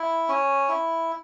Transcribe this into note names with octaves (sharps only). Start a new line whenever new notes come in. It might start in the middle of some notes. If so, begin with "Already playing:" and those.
Already playing: E4
C#4
E4